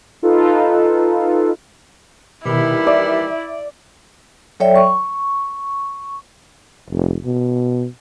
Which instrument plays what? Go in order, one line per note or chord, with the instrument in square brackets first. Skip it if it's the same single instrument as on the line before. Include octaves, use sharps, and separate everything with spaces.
[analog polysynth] D#4 F4 A4 B4
[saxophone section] D#2 E3 G3 [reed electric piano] B2 D#3 [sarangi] E4
[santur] D5 [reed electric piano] E5
[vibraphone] F#3 A4 C#5 D5 E5 G5
C#6
[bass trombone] F1
B2